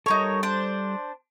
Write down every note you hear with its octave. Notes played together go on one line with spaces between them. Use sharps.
G3 D#4 A4 A#4 C#5
D4 C5